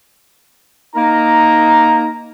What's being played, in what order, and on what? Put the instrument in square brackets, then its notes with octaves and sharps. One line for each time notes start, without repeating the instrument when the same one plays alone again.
[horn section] A#3 D#4 A#4 A#5